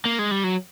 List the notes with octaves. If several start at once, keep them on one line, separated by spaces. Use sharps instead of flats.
A#3
G#3
G3
F#3